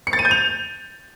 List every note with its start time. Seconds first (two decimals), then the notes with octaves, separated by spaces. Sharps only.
0.07 C#7
0.13 A6
0.19 D#7
0.25 G6
0.31 F7